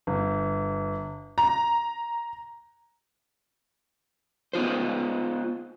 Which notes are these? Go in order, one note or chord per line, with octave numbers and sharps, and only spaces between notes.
G1
A#5
B3 D#4 F4 C5